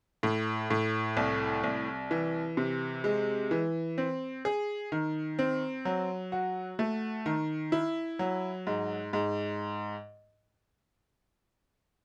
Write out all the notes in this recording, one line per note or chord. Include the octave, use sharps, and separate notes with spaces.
A2
A2
C2
C2
E3
C3
G#3
E3
C4
G#4
D#3
C4
F#3
F#4
A3
D#3
E4
F#3
G#2
G#2